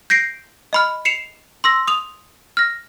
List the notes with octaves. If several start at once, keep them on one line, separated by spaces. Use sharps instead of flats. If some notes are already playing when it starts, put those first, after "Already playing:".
G6 A#6 C7 D7
D#5 B5 F6
C7 C#7 E7 F7
C6 E6 A#6
D#6 F7
F6 A#6